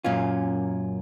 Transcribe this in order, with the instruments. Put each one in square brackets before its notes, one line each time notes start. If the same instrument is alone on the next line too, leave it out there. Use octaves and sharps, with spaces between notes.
[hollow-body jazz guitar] F#2 A#2 C#4 F4